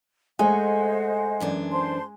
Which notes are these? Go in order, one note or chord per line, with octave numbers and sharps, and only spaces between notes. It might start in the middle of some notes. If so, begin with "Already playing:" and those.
G#3 A3 C5 D#5 F#5 G#5
F#2 E3 D4
C5 A5 C6